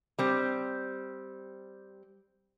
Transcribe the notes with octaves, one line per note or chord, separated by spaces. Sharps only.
G3 C4